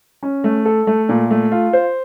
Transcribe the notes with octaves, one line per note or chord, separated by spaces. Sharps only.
C#4
A3
A4
A3
A#2
A3
F4
C5